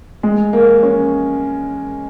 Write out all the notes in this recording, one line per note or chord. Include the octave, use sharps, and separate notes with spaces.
G#3
A#3
C#4